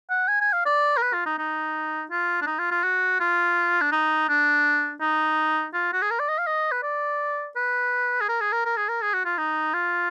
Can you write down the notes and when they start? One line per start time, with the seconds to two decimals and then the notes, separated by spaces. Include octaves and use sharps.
0.10 F#5
0.28 G#5
0.41 G#5
0.53 F5
0.66 D5
0.97 A#4
1.02 B4
1.13 F4
1.26 D#4
1.38 D#4
2.11 F4
2.42 D4
2.47 D#4
2.59 F4
2.71 F4
2.83 F#4
3.20 F4
3.81 D4
3.92 D#4
4.29 D4
5.01 D#4
5.74 F4
5.93 F#4
6.02 G#4
6.11 A#4
6.20 D5
6.29 D#5
6.38 F5
6.47 D#5
6.72 B4
6.83 D5
7.56 B4
8.21 G#4
8.29 A#4
8.41 G#4
8.52 A#4
8.65 A#4
8.77 G#4
8.89 A#4
9.02 G#4
9.14 F#4
9.25 F4
9.38 D#4
9.74 F4